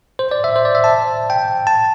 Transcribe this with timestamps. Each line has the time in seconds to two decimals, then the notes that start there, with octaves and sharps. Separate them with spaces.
0.19 C5
0.31 D5
0.44 E5
0.56 C5
0.65 D5
0.75 E5
0.84 A5
1.30 G5
1.67 A5